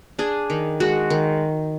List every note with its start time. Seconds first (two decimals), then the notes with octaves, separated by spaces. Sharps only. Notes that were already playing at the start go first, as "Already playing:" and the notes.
0.19 D4 G#4
0.50 D#3
0.80 G#3 F#4
1.10 D#3